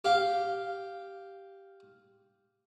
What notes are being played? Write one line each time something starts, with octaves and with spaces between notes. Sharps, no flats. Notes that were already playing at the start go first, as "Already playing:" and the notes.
G4 F5